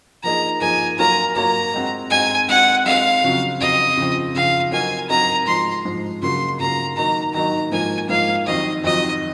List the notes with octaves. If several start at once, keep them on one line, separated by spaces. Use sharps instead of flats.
F3 A#3 D#4 G#4 A#5
F3 A#3 D#4 G#4 G#5
F#3 A#3 F4 A#4 C#5 A#5
F#3 A#3 F4 A#4 C#5 A#5
G#3 C4 F#4
G#3 C4 F#4 G#5
G#3 C4 F#4 F#5
G#3 C4 F#4 F5
F2 C#3 F#3 C4
F2 C#3 F#3 C4 D#5
C#3 F3 C4
C#3 F3 C4 F5
F#3 C4 F#4 A#4 D#5 G#5
F#3 C4 F#4 A#4 D#5 A#5
G#2 F3 G#3 C6
G#2 F3 G#3
C#3 F#3 A#3 F4 C6
C#3 F#3 A#3 F4 A#5
D#3 F#3 A#3 D#4 A#5
D#3 F#3 A#3 D#4 A#5
G#2 F3 A#3 G#5
G#2 F3 A#3 F5
F2 D#3 F#3 C4 D#4 D#5
F2 D#3 F#3 C4 D#4 D#5